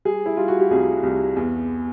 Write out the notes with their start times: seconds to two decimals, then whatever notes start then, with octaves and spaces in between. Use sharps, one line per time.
0.05 G3 G#4
0.26 E4
0.37 G3 F4
0.48 F#4
0.60 G4
0.71 C2 G#4
1.03 C2
1.36 E2